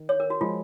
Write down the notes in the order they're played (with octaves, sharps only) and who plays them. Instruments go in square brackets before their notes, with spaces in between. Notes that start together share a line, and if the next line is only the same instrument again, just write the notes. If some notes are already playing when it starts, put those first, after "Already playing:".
Already playing: [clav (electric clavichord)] D#3
[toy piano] C#5
A#4
F#4
[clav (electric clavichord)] F3 G#3 [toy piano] F4